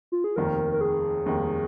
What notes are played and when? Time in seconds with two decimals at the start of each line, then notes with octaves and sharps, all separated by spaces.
0.12 F4
0.24 G#4
0.36 F1 D#2 D#3 A#4
0.73 A#4
0.81 G#4
1.25 F1 D#2 D#3